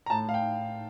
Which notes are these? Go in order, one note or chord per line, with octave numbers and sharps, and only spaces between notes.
A#5
A2 A5
A2 F5
G5